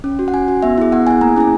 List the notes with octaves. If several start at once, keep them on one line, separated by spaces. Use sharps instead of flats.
C#4
F#4
F#5
C#4 G#5
F#4
B3 E5
E4 G#4
B3 F#5
E4 G#4 G#5
A#3 A#5
C#4 E4 G#4 G#5